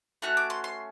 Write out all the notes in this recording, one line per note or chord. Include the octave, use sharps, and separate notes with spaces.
A3 C#4 F#4 F#6
D6
C6
C6